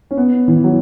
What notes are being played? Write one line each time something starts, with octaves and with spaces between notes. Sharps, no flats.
C#4
B3
E3
F#3